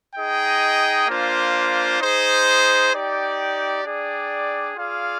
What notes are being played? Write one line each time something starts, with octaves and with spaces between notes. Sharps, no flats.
D#4 G#4 D#5 G5
A#3 D4 F4 C5
D#4 G#4 C5
D#4 G4 D5 G5
D4 G#4 D5 G5
F4 G#4 D5 F5